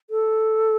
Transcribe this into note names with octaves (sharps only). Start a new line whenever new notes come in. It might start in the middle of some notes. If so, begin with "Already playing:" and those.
A4